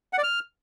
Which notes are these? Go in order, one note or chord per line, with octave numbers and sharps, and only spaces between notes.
F#5
D5
F6